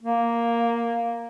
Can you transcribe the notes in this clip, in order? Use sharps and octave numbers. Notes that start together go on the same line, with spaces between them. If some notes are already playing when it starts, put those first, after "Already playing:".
A#3